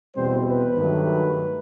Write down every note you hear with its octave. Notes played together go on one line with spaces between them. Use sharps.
E2 B2 G3 C4 C5
B4
G2 D#3 F#3 A3